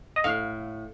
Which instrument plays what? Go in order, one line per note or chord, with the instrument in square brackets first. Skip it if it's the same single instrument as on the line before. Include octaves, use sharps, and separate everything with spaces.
[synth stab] D#5
[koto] A2 [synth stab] F5